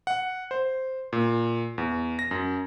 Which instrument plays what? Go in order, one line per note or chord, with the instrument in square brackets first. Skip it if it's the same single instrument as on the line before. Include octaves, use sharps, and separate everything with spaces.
[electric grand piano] F#5
C5
A#2
E2
A#6
F#2